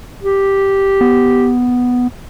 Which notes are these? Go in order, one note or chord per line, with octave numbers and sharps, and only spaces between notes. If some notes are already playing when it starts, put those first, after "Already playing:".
G4
B3